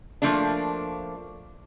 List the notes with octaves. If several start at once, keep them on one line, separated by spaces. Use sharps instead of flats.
F3 A3 A#3 D4